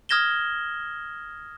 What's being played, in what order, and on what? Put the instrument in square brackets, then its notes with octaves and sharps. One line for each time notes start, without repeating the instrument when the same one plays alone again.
[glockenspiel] D#6 F6 G#6 A#6 E7 G7